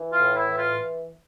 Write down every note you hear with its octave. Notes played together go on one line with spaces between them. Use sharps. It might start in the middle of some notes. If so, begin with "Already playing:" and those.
Already playing: E3
F4
A2
E4
E3
F4